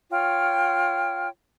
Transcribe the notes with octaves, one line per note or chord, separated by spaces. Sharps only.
F4 C#5 G5 F6